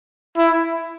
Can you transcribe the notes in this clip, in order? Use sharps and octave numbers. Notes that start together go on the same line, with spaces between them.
E4